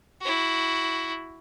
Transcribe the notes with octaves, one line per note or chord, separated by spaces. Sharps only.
E4 F#4